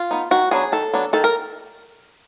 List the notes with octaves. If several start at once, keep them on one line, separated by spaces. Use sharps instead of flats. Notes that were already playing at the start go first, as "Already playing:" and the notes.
Already playing: F4
B3 D#4
D#3 F#4
F#3 B3 D4 G#4
D#3 A4
F#3 B3 D4
D#3 A4
A#4